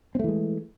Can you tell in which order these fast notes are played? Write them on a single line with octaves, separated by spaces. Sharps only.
C4 A3 E3 G#3